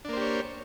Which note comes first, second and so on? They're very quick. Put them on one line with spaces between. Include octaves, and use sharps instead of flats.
D4 A#3 C5 G4 C#5